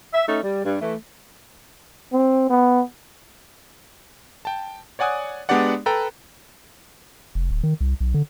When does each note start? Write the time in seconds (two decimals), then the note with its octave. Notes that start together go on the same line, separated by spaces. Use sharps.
0.14 E5
0.27 A3 C#4 D#4
0.43 G3
0.65 G2
0.81 E3 A3
2.13 C4
2.50 B3
4.45 G5 A5
4.99 C#5 D5 F#5 G#5 D#6 F#6
5.49 G#3 B3 D4 G4 D5 F#5
5.86 A4 B4 G5 A#5
7.35 F1
7.51 D1
7.63 D#3
7.81 C2
8.00 B1
8.14 D3